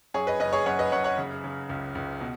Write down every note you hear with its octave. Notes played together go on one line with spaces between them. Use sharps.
F#2 G#4 C#5
B4 D#5
F#1 B4 D#5
G#4 C#5
F#2 C#5 F#5
B4 D#5
F#2 C#5 F#5
C#5 F#5
C#3
C#3
C#2
C#2
B2